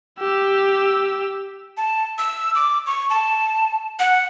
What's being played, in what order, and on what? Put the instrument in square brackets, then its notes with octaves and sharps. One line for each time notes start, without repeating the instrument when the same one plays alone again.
[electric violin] G4 E6
[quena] A5
E6
D6
C#6
A5
F#5